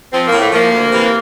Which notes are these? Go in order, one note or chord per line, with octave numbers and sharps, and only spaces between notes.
F3 C4
A#3
A2
A3
F3 A#3
D2
C3 E3